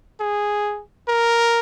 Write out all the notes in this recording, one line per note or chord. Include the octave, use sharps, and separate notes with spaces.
G#4
A#4